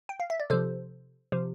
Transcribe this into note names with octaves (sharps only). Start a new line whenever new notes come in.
G5
F5
E5
D5
C3 F3 A4 C5
C3 F3